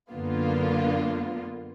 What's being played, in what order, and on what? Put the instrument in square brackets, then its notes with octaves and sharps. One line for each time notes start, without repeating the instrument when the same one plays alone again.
[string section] F#2 D3 A#3 B3 F4